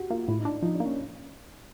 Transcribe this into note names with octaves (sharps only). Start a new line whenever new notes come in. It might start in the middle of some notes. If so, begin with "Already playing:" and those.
Already playing: F#4 G4
A#3 F4
A2 E4
D#4
D4
F3 D#4
D4
A#3
C#4